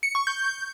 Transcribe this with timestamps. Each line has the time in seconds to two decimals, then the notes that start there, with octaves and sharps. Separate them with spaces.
0.03 C#7
0.15 C#6
0.27 G6